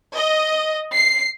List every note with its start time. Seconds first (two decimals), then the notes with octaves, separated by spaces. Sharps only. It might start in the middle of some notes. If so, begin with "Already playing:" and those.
0.14 D#5
0.94 C7